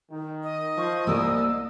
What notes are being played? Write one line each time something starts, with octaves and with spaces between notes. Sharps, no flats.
D#3
D#5
F3 C#6
C2 A#3 D5 E6